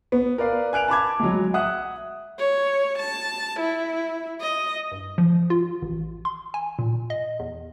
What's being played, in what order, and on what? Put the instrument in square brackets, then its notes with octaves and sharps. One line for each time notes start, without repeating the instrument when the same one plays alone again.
[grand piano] B3
A#4 B4 D5 F5
G#5 F#6 D7 F7
A5 B5 D6 G#6
F#3 G#3
E5 F#5 D#6 F#6
[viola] C#5
A5
E4
D#5
[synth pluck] G2
F3
F4
A1
C6
G#5
A#2
D#5
E2